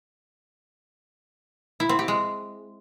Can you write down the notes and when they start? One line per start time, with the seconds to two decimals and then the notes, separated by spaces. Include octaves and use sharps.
1.80 E4
1.89 C4
1.99 G4
2.08 G#3